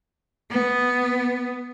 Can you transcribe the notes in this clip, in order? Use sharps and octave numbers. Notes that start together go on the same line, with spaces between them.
B3